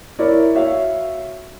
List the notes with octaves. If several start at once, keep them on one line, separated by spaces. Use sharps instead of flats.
E4 A#4 C#5 D5
F#4 C#5 E5 F5